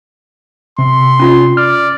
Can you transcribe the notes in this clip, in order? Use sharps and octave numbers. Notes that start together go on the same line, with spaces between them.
C3 C6
C#4 F4 F#5
D5 F6